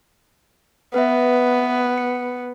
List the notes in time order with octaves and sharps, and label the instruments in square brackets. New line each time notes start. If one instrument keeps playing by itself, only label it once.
[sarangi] B3 [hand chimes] B4 E5
[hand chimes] C#7